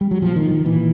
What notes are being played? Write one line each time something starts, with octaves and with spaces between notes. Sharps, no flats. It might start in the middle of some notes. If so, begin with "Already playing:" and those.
G3
F#3
A#2 F3
D#3
D#3
A#2 E3